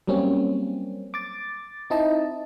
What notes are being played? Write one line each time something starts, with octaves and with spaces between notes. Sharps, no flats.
F#3 G3 A#3 C4 C#4
D6 A6
C4 D#4 E4 D#5 A5